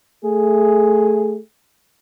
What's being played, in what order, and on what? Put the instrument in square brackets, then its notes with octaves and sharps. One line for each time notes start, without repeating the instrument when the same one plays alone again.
[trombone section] A3 G#4